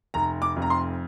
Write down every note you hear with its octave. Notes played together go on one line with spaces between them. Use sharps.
F1 A#5
D6
F2
A#5
C6